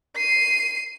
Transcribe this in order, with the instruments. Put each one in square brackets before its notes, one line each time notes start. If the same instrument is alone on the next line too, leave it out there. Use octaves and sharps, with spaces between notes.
[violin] C7 D#7